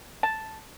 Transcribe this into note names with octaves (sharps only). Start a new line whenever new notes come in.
A5